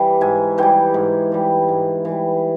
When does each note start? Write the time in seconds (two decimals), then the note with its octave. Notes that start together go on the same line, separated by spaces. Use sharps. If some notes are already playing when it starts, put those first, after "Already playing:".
Already playing: E3 G3
0.21 G#2 G#5
0.58 E3 G3 G5
0.94 G#2
1.32 E3 G3
1.69 G#2
2.05 E3 G3